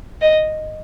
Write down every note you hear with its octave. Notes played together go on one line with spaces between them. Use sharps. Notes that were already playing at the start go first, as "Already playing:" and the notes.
D#5